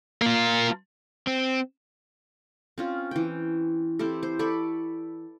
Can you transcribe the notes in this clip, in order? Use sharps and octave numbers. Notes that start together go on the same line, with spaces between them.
A#3 F4
C4
C4 C#4 F4
E3 G5
C4 E4 G4 A4
C5
A4 D5 B5 C#6